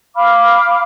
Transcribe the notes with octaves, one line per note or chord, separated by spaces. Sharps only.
F5 B5 D6 F6